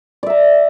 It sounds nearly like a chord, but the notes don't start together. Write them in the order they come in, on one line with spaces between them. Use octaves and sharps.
D5 E5 A#5